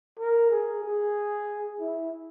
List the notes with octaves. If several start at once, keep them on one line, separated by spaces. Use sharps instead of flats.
A#4
G#4
G#4
E4